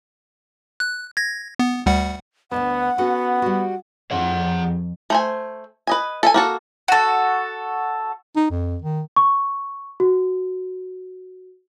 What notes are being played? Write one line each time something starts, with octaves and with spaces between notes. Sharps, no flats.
F#6
G#6 A#6
B3
D2 G3 F#5
D2 G2 B3 F#5 A5
B3 C#4 F#4 A4
G3 F#4
F2 G#4 F#5
A3 C5 G#5
B4 D#5 G#5
A4 E5 G#5
A#3 F#4 A4
F#4 A4
D#4
F2
D#3
C#6
F#4